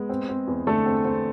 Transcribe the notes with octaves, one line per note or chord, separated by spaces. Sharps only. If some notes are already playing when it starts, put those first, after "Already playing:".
Already playing: G#3 B3
C4
C4
E2
D3 A3 A4
C4
C4